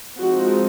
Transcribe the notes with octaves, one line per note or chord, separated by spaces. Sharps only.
F3 G#3 C4 D#4 F#4